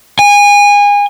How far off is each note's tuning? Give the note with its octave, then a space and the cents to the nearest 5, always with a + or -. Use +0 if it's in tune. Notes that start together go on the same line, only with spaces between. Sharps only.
G#5 -25